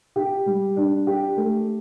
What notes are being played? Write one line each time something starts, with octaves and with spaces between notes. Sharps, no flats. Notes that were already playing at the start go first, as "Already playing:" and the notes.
G4
G3
D4
G4
A3